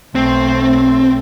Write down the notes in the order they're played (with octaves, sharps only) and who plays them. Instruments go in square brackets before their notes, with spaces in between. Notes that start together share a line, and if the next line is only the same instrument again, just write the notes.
[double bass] B1 A3 [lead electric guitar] C4